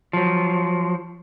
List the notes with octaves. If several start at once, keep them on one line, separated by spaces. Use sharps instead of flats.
F3 F#3